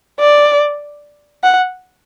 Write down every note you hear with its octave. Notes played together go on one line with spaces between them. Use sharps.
D5
F#5